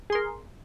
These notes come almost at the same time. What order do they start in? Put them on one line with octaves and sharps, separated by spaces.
G#4 C6 A#4